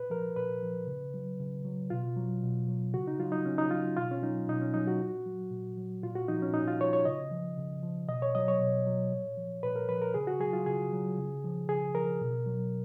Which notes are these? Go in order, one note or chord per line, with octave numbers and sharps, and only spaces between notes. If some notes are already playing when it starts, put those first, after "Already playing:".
Already playing: A#2 B4
F3 A#4
A#2 B4
F3
C#3
F#3
C#3
F#3
B2 F4
F#3
B2
F#3
C#3 F#4
D#4
F#3 F4
D#4
C#3 C#4
D#4
F#3 F4
B2 F4
C#4
F#3 D#4
B2 D#4
C#4
F#3 D#4
F#4
A#2
F#3
A#2
F#3
A#2 F4
F#4
F3 D#4
C#4
A#2 D#4
F4
F3 C#5
C#5
C#3 D#5
F3
C#3
F3
B2 D#5
C#5
F#3 D#5
C#5
B2
F#3
A#2
F3
A#2 B4
A#4
F3 B4
A#4
C#3 G#4
F#4
F#3 G#4
F4
C#3 G#4
F#3
C#3
F3
C#3 G#4
F3 A#4
B2
F#3